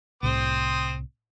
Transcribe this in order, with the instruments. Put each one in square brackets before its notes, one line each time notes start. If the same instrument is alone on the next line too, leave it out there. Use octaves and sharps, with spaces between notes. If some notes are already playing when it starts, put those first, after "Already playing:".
[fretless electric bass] C2 A2 C3 [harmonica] C4 C5 D#6